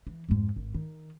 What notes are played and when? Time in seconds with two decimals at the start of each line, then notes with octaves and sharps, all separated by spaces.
0.07 E3
0.29 F2 G#2
0.56 G#1
0.74 D#3